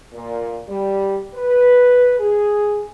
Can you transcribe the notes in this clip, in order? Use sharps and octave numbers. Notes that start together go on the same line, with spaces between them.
A#2
G3
B4
G#4